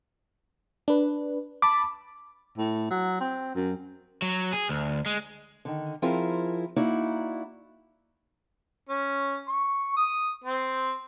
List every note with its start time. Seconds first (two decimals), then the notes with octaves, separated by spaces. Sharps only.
0.88 D4 B4
1.62 A5 B5 D6
2.58 A2
2.90 F#3
3.20 C4
3.55 F#2
4.22 F#3
4.52 G#4
4.69 D2
5.06 G#3
5.65 D3 D#3
6.02 F3 C4 E4 F4 G#4 A#4
6.76 A#3 D#4 E4 F#4 D5
8.89 C#4
9.48 C#6
9.97 D#6
10.44 C4